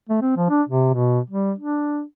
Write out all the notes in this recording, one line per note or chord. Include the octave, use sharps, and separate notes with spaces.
A3
C4
F3
D4
C3
B2
G3
D4